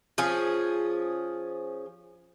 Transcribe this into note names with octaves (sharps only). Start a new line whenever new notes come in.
F3 C#4 G#4